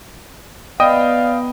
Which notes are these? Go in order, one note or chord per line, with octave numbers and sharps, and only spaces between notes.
B3 D5 D#5 F5 G5 D#6